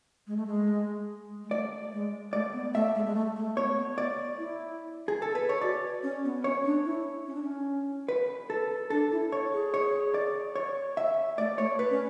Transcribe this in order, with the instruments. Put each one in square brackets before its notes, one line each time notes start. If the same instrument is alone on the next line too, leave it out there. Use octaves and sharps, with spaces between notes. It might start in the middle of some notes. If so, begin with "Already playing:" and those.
[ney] G#3
A3
G#3
G#3
[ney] A3 [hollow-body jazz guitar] D5
[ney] G#3
[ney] A3 [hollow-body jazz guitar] D5
[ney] B3
[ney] A3 [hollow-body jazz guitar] E5
[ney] G#3
G#3
A3
A3
[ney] B3 [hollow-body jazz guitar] C#5
[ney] B3
[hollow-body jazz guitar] D5
[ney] E4
[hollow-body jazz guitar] G#4
A4
B4
C#5
[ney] F#4 [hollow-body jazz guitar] D5
[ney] C#4
B3
[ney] C#4 [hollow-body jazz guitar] C#5
[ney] D4
E4
C#4
D4
C#4
[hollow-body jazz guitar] B4
A4
[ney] D4 [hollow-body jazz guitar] A4
[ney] E4
[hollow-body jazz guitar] C#5
[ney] G#4
[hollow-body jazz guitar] C#5
D5
C#5
E5
[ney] A3 [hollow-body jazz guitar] D5
[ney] A3 [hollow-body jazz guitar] C#5
[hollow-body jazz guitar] B4
[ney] C#4